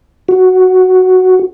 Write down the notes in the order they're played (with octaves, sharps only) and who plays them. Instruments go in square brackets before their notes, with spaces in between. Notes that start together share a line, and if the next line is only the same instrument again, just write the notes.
[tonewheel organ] F#4